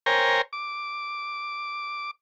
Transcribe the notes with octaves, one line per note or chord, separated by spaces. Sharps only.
A#4 C5 C#5 G5 G#5 A#5
D6